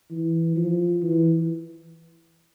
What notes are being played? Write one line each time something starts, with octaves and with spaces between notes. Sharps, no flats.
E3
F3
E3